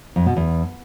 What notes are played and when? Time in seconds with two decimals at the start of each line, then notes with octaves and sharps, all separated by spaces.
0.16 F2
0.26 B2
0.37 E2